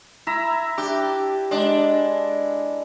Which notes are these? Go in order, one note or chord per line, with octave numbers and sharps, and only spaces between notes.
E4 E5 A#5
D4 G4
G#3 D4